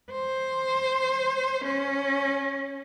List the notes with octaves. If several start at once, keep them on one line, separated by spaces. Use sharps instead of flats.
C5
C#4